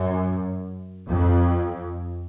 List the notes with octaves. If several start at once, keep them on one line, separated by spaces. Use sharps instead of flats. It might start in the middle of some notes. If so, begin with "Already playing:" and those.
Already playing: F#2
F2